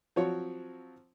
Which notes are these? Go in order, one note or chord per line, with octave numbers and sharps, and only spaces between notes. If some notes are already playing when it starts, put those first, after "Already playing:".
F3 F#3 C4 F4 F#4 C#5